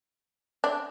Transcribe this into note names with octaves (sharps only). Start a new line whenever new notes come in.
D4